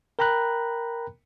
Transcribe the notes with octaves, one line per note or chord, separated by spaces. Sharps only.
A#4 G5 A#5 B5 F#6